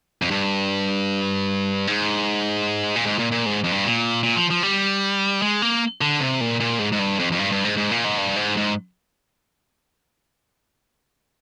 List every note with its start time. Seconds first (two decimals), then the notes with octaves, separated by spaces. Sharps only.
0.22 F2
0.31 G2
1.87 G#2
2.95 A#2
3.06 G#2
3.19 A#2
3.32 A#2
3.46 G#2
3.64 F2
3.72 G2
3.85 A#2
4.23 A#2
4.36 F3
4.50 F3
4.63 G3
5.42 G#3
5.62 A#3
6.01 D3
6.20 C3
6.41 A#2
6.60 A#2
6.79 G#2
6.92 G#2
6.99 G2
7.19 F2
7.32 F2
7.39 G2
7.52 G2
7.64 G#2
7.77 G#2
7.91 A#2
8.04 G#2
8.18 G2
8.36 G#2
8.57 G#2